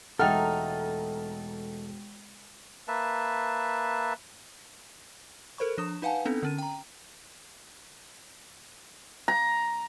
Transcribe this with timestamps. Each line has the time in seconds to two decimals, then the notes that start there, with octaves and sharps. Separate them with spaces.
0.19 E1 A3 D#4 A4 F#5 G5 A#5 F6
2.88 A#3 B4 E5 A5
5.58 A4 A#4 C5 B5 C#6
5.78 F3 D4 D#6 E7
6.02 D#4 B4 F5 F#5 G#5 A5
6.25 B3 C4 D4 D#4 A4
6.43 D3 C#4 D#7
6.58 G5 A#5
9.28 A#5